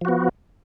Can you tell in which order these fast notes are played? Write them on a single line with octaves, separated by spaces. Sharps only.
F3 F#4 B3